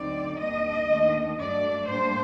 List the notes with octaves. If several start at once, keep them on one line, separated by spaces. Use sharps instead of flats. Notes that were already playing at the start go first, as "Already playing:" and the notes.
Already playing: D2 D3 F#3 C4 D#4 D5
D#2 D#3 G3 D4 D#5
D#2 D#3 A3 D4
G2 F#3 A3 D4 D5
A2 G3 A#3 D4 C5